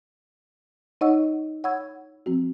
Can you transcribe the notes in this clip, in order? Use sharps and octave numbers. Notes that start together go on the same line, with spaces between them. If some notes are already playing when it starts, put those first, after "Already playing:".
D#4 C#5 D#5 F#5 C#6 E6
C#5 F#5 B5 C#6 E6 G#6
F3 C4 F#4